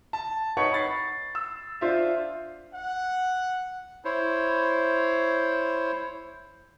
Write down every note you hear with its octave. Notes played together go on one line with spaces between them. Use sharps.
A5
D#4 B4 C#5 F#5 C#6
B5 C#6 A6 C7
E6
D4 F4 C5 E5
F#5
E4 C5 C#5